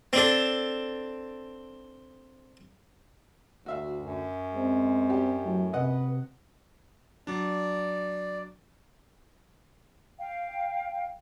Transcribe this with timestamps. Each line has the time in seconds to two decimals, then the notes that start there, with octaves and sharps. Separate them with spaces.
0.13 C4 D4 A4
3.66 D2 F#4 E5 F5
4.01 F#2
4.55 G#3 C4
5.10 G3 G4
5.45 A2 F#3
5.73 C3 B4 D#5 F#5
7.27 F#3 D4 D5
10.19 F5 G5